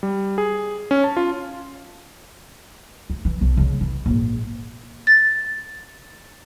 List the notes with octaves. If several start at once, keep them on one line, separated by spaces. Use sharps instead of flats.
G3
G#4
C#4
A5
F4
D2
E3
B1 F3
C#3 G#3
E3
A#1 G#2
A6